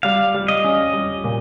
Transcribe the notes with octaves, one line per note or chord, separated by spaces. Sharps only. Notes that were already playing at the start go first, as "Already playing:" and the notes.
G3 F5
G3
D#5
C#4
G3
A#2